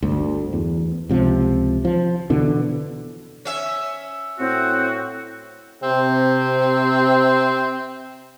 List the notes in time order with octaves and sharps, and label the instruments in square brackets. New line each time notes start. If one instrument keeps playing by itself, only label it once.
[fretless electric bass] G1 D2
E2
C#2 C3 F3
F3
B2 D3 E3
[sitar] C#4 E5
[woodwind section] A2 F#4 [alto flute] C4
[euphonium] C3 [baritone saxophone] C4